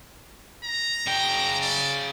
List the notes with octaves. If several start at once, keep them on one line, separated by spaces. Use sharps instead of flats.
A#5
C#3 G5
D5